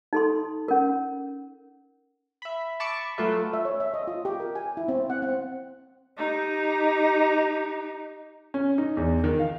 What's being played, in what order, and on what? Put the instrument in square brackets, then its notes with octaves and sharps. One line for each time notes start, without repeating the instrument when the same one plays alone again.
[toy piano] D#4 A4 C6
C#4 A#4
[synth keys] E5 B5
A5 B5 C#6 D6
F#3 A3 F4 A4 B4 E5
[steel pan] E5
C#5
E5
D#5
F4
G4
A#4
G#5
E4
C4
F#5
C4
[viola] D#4 G4
[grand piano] C#4
D#4
E2
D#3
F5